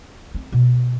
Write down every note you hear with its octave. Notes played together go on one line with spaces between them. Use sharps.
C4
B2